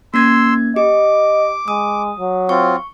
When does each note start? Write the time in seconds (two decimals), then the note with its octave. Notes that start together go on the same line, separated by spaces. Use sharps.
0.14 A#3 C#4 C6 E6 G#6
0.76 G4 D#5 D6
1.68 G#3 D#6
2.19 F#3
2.49 C4 F4 C#6